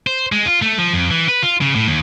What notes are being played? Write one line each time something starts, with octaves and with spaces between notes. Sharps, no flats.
C5
G#3
F4
A3
F3
F2
E3
B4
F4
C#3
A2
D#2